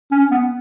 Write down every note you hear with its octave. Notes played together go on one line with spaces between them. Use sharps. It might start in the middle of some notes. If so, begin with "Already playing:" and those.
C#4
B3